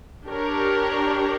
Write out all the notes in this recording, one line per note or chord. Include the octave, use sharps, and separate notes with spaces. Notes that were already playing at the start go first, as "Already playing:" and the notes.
D4 G4 A#4 C#5